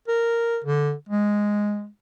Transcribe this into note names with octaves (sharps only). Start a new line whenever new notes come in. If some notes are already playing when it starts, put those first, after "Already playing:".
A#4
D3
G#3